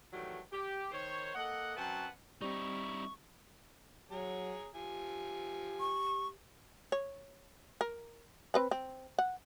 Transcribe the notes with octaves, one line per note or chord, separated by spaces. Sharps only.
D#3 E3 F#3 G3 A3
G4
D#3 C5 C#5
A#3 A4 D#5 F#5
F#2 F#3 C4 B4 F#5 A5
G3 C4 D#4 E4 C#6
F#3 G#4 C#5 A#5
F3 G4 G#5
C#6
C#5
A#4
C4 B4 B5
C4
F#5